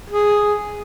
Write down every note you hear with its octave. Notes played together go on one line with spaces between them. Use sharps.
G#4